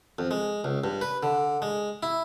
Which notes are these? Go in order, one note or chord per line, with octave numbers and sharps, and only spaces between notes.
F2
G#3
C#2
G2
B4
D3
G#3
E4